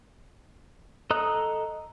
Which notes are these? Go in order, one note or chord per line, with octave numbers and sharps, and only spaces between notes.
A4 D#5 A#5 D#6 F#6